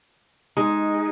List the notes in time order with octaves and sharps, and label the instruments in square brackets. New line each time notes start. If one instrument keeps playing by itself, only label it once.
[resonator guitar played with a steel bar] G#3 [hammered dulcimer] D#4